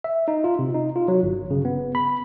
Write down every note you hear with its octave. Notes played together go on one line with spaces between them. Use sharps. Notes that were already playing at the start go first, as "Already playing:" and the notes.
E5
D#4
F4
C3
D#4
F4
F#3
G1
C#3
B3
B5